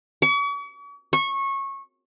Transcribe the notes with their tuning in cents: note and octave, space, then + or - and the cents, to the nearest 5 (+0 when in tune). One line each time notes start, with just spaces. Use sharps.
C#6 +45
C#6 -20